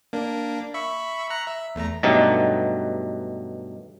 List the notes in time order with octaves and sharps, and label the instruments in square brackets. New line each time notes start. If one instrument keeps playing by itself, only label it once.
[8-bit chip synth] A#3 D4
E5 B5 C#6
A#5 F#6
E5
E2 A3 A#5
[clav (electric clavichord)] G2 B2 F#3 A3 D#4 G4